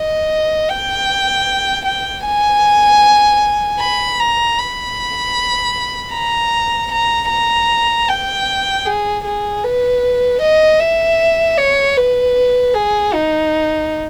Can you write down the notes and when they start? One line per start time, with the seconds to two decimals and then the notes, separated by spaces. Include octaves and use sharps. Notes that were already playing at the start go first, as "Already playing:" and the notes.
Already playing: D#5
0.69 G5
1.85 G5
2.25 G#5
3.80 B5
4.19 A#5
4.59 B5
6.13 A#5
6.92 A#5
7.30 A#5
8.09 G5
8.86 G#4
9.24 G#4
9.64 B4
10.41 D#5
10.80 E5
11.58 C#5
11.97 B4
12.74 G#4
13.14 D#4